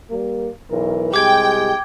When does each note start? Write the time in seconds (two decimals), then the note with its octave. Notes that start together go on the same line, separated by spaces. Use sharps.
0.11 G3 A#3
0.71 B1 E3 A#4
1.14 C2 G#3 G4 G5 D6 G#6